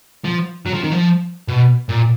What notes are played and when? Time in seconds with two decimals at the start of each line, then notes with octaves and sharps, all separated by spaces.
0.25 F3
0.66 F#3
0.74 F3
0.83 D#3
0.91 F3
1.48 B2
1.89 A#2